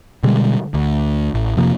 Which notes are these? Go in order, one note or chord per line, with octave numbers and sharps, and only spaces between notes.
B2 D3 G3 G#3
D2
A1
F1 C3 F3 A#3